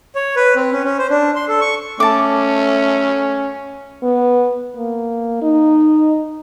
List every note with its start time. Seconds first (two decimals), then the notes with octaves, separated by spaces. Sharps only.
0.15 C#5
0.36 B4
0.56 C4
0.72 C#4
0.85 C#4
0.98 C5
1.10 D4
1.35 C6
1.48 A4
1.61 C#6
2.00 A3 C#4 A5 D6
4.03 B3
4.77 A#3
5.42 D#4